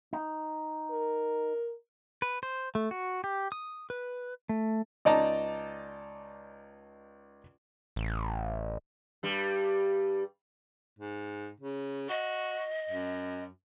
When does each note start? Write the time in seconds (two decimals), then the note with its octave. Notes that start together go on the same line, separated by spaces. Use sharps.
0.13 D#4
0.91 A#4
2.22 B4
2.43 C5
2.75 A3
2.91 F#4
3.24 G4
3.52 D#6
3.90 B4
4.49 A3
5.05 C#2 D#4 D5 D#5 A5 A#5
7.96 A1
9.23 G2 G3
10.99 G#2
11.60 C#3
12.09 F#4 D#5
12.89 F#2